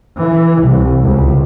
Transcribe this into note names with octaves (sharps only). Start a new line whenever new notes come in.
E3
C2
C#2